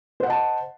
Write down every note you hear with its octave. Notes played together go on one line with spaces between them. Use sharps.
C5 D#5 F#5 A5